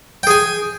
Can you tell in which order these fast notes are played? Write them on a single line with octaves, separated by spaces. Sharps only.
G5 G#4 G#5